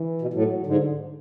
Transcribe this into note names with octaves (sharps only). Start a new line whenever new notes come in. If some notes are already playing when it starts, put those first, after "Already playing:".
Already playing: E3
B2
A2 F#3
G#2 D3